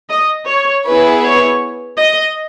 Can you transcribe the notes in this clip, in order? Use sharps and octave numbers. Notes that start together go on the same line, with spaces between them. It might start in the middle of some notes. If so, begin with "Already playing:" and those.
D#5
C#5
B3 E4 G#4 B4
C#5
D#5